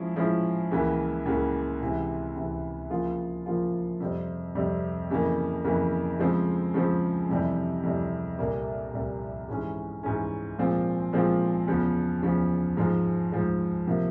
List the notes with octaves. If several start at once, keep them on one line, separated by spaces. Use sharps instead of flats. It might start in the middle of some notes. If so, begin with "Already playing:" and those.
Already playing: F3 G#3 C#4 E4
F3 G#3 C#4 E4
C#2 C#3 E3 A#3
C#2 C#3 E3 A#3
C#2 C3 E3
C#2 C3 E3
C#3 F3 A#3 F4 G#4
C#3 F3 A#3 F4 G#4
F2 C3 G3 C4
F2 C3 G3 C4
F2 C#3 E3 A#3
F2 C#3 E3 A#3
C#3 F3 G#3 C4
C#3 F3 G#3 C4
F2 C3 E3 G3
F2 C3 E3 G3
C2 A#2 G3 A#3
C2 A#2 G3 A#3
G#2 E3 G#3 C#4
G#2 E3 G#3 C#4
A#2 F3 G#3 C4 F4
A#2 F3 G#3 C4 F4
E2 C#3 F3
E2 C#3 F3
G#2 F3 G#3
G#2 F3 G#3
C3 F3 A#3